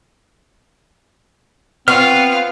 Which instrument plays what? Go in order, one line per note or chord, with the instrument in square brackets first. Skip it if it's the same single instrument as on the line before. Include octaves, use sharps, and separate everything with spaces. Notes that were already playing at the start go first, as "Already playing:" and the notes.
[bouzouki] B3 [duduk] C4 [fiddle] F4 F5 [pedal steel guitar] B4 C#6 F6